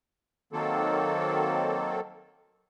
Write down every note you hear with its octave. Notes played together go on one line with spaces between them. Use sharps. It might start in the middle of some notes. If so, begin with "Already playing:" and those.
D#3 F#3 A#3 C4 A4